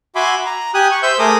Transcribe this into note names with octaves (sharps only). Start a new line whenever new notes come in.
F#4 E5 G#5 B5 C6 D6
A#5
G4 G#5 D#6 F#6
C#6
C5 E5 E6 G6
A3 G#4 A#4 D6 D#6